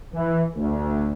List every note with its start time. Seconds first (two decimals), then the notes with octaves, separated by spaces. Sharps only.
0.13 E3
0.56 D2